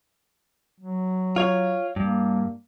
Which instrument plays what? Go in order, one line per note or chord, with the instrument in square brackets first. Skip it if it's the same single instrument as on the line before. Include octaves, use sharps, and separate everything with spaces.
[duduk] F#3
[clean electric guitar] F4 C#5
[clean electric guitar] G2 [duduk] A#3